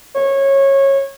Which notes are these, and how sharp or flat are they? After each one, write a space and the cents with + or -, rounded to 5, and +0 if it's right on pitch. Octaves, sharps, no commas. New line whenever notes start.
C#5 -20